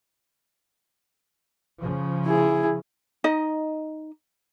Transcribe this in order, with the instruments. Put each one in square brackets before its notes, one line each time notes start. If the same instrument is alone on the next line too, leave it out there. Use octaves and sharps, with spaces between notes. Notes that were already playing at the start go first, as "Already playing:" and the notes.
[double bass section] C#3 F3
[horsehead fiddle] E4 G#4
[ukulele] D#4 D#5